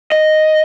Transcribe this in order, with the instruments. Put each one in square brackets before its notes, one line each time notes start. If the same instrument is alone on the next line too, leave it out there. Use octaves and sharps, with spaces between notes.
[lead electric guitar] D#5